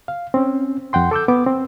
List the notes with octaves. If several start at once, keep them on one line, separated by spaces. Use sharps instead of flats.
F5
C4 C#4
F2 F#5 G5 C6
A4 D6 E6 G6
B3 D6
C4